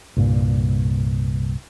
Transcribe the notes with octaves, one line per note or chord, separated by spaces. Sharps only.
C2 G2 A#2